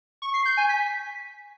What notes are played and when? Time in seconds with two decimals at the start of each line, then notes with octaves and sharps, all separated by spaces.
0.22 C#6
0.34 C7
0.45 G6
0.57 G#5
0.69 B6